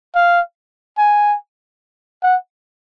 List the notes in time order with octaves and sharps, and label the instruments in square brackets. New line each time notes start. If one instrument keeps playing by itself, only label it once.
[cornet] F5
G#5
F#5